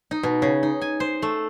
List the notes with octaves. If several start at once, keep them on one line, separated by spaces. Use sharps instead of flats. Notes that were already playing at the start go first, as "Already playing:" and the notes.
D#4
B2
C#3
D#4
G#5
C5
A3